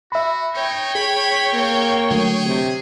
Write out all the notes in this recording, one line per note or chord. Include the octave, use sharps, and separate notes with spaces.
F#4 E5 B5
D#4 C#5 G5
G#4 B5
A#3 C4
D3 F#3 A3 G#4
C3